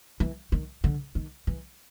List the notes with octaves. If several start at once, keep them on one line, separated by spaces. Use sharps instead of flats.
E3
D#3
D3
D#3
E3